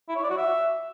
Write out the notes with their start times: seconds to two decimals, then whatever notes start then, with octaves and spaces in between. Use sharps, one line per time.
0.09 E4
0.16 C#5
0.23 D5
0.30 F#4
0.37 E5